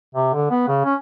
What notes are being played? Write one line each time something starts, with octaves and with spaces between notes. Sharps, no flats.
C3
D3
B3
C#3
C#4